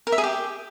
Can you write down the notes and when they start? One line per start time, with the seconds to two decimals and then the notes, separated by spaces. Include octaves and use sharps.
0.07 A#4
0.12 E5
0.18 G#4
0.24 G4